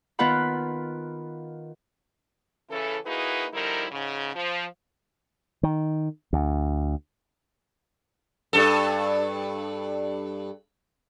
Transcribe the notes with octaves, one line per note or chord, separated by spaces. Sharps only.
D#3 B3 F4 B4 F#5 B5
C#3 E3 C#4 E4 A4
A#3 D#4 E4 F#4 G#4 B4
D3 F3 G3 D#4 E4 A#4
G#2 C#3
F3
D#3
D2
G2 A4